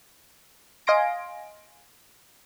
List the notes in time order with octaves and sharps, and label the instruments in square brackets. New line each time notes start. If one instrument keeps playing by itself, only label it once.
[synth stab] D#5 F5 G#5 C6 A#6 D7